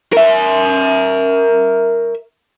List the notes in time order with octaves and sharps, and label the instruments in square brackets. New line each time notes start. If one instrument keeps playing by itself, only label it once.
[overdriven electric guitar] A#4 E5